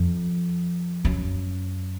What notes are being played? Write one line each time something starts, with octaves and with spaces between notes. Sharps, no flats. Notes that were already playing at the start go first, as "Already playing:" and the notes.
Already playing: F2
F#2